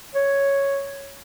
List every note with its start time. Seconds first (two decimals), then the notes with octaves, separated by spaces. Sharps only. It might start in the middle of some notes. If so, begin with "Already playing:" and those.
0.15 C#5